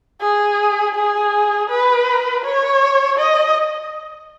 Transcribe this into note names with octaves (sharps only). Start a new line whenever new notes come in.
G#4
G#4
B4
C#5
D#5